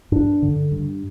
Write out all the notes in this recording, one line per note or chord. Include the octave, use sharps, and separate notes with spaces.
G2 D4
D3
G2